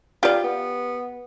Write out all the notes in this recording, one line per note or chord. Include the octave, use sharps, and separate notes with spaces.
F4 G4 D5
B3